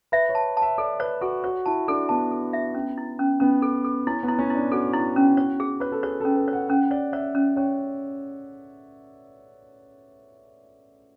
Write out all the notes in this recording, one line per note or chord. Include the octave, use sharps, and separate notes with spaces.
B4 E5
C#5
A5
A5
E5
A4 D5
B4 C#5
F#4 A4
F#4 C#5
E4 A5
D4 A4
B3 A5
A4
E5
C#4
E4
C#4
B3 C#4
A4
A4
C#4 E4
B3
E4
C#4
E4
D4
F#4 A4
E4
C#4
C#5
G#4
B4 C#5
A4
G#4 C#5
C#4 A4
B4
C#5
F#5
C#4 F#5
C#5 D5
C#5 E5
C#4
C#4 C#5